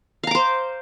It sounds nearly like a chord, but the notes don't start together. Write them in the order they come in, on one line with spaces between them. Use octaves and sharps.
F5 A#5 D6 C5